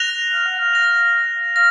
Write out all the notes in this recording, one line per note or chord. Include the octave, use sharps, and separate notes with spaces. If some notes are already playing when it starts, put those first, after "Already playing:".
Already playing: F#6 A#6 F7
F5
F#5
F5
F#6 A#6 F7
F5 A#6